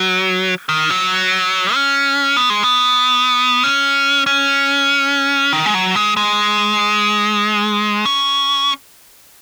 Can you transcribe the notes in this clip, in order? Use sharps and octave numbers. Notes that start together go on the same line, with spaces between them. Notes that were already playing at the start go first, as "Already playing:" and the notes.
Already playing: F#3
D#3
F#3
C#4
B3
G#3
B3
C#4
C#4
D#3
G#3
F#3
G#3
G#3
C#4